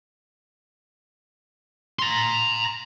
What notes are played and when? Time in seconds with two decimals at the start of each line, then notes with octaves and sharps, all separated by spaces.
1.99 A#5 C6